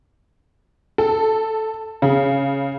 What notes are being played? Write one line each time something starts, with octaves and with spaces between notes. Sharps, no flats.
A4
C#3